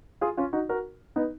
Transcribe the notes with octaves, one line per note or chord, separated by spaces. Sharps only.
F4 G#4
C#4 F4
D#4 F#4
F#4 A#4
B3 D#4